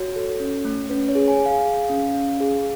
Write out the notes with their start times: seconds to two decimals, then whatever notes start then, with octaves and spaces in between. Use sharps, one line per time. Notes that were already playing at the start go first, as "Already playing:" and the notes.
Already playing: F#4 C#5
0.16 A4
0.40 C#4
0.65 A3
0.90 C#4 B4
1.09 C#5
1.15 G#4
1.28 G#5
1.40 G#4
1.46 F5
1.65 G#4
1.90 C#4
2.15 C#4
2.40 G#4